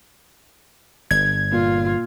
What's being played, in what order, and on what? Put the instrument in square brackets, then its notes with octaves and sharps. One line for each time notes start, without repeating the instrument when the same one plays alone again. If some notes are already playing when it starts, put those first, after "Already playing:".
[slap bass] G1 [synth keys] G#6
[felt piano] A#2 [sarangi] F4